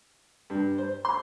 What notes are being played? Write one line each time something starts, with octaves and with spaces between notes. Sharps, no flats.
G2
C5
C6